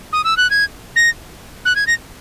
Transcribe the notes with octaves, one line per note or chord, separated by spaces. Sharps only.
D#6
E6
F#6
G#6
A#6
F#6
G#6
A#6